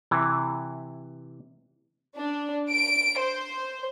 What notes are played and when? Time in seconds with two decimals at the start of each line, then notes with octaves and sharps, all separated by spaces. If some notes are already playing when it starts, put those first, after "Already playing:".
0.11 C3 E3
2.18 D4
2.71 D7
3.20 C5